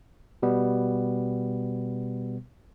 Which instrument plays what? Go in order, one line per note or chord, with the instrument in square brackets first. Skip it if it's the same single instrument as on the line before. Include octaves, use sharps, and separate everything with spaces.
[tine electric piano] B2 G3 B3